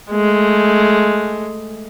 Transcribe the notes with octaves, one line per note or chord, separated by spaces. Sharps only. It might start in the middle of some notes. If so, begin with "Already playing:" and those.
G#3 A3